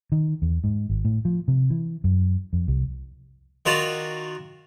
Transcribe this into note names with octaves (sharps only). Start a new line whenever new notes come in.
D#3
E2
G#2
G#1
A2
F3
C3
E3
F#2
F2
C2
D#3 F4 F#4 D5 A5